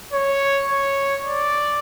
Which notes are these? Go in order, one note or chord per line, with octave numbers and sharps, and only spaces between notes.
C#5
C#5
D5